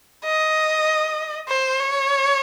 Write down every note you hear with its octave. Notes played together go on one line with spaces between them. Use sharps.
D#5
C5
C#5